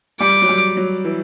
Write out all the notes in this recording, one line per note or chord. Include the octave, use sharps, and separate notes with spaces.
G3 D6
F#3
G3
F#3
E3